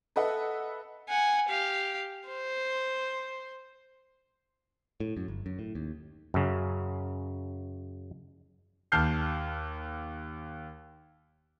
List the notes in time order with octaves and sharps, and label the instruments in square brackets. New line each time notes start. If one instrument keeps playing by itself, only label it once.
[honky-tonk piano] A4 B4 D#5 E5 F#5
[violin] F#5 G#5
G4 F5
C5
[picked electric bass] A2
F#2
G1
F#2
A2
D#2
[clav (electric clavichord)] F#2 C#3
[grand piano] D#2 A5 F6 G6 C7